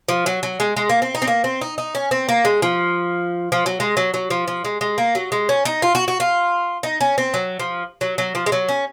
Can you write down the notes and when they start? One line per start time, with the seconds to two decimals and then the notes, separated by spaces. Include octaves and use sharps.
0.09 F3
0.26 F#3
0.43 F#3
0.60 G#3
0.77 G#3
0.89 A#3
1.02 C4
1.15 D#4
1.22 C4
1.27 A#3
1.44 C4
1.61 D#4
1.78 D#4
1.95 C#4
2.11 C4
2.29 A#3
2.45 G#3
2.62 F3
3.52 F3
3.66 F#3
3.80 G#3
3.97 F#3
4.14 F#3
4.30 F3
4.48 F3
4.65 G#3
4.81 G#3
4.98 A#3
5.15 F#3
5.32 G#3
5.49 C#4
5.65 D#4
5.82 F4
5.95 F#4
6.08 F#4
6.20 F4
6.83 D#4
7.01 C#4
7.18 C4
7.34 F#3
7.59 F3
8.01 F#3
8.18 F#3
8.35 F3
8.46 G#3
8.52 F#3
8.69 C#4